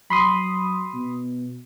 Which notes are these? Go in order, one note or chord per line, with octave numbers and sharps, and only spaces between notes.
F#3 B5 C6 D#6
B2